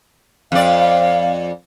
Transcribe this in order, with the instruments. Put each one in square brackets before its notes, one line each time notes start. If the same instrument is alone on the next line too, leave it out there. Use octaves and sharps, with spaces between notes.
[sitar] F2 D5 [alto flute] F5